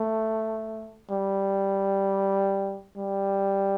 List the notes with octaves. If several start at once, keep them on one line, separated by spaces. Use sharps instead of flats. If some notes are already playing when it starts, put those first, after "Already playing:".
Already playing: A3
G3
G3